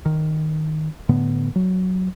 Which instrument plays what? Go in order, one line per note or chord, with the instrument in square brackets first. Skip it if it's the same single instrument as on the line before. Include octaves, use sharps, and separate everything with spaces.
[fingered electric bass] D#3
A2 D3 B3
F#3